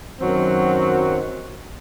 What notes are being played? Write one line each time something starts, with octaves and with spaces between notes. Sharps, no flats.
F#2 D#3 F#3 C4 F#4